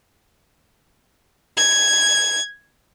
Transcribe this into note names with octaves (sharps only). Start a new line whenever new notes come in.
G#6